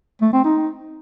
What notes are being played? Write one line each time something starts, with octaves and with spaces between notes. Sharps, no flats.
A3
C4
D#4